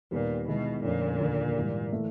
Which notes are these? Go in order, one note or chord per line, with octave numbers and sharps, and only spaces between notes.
D#2 A#2 D#3 G3 B3
B2 D#3 G#3 B3 E4
F2 A#2 D3 F3 A3 C#4
D#2 D3 F3 A#3
G#2 E3 G3
A2 E3 A3